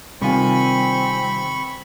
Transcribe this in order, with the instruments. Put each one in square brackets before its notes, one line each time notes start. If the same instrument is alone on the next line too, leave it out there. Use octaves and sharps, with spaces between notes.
[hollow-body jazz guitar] C3 D#3 F4 [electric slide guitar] G3 G#5 [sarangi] C4 [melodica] B5 C#6